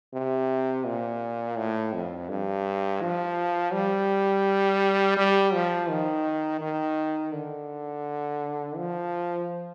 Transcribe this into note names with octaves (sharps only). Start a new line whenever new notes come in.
C3
A#2
A2
F2
G2
F3
G3
G3
F3
D#3
D#3
D3
F3